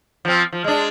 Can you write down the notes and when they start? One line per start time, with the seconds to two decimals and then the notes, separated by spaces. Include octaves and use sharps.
0.25 F3 C4
0.53 F3
0.64 G#3 D4